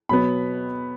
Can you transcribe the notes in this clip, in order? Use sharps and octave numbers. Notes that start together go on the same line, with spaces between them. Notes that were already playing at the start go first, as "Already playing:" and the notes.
B2 F#3 B3 B5